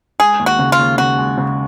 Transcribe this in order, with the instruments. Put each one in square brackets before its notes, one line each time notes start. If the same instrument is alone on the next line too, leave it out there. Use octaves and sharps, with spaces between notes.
[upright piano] G#3 [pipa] G#4
[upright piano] D#2
[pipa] F#4
[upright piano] C#3
[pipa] F4
[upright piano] D#2
[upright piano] C#3 [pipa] F#4
[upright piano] G#3
C#3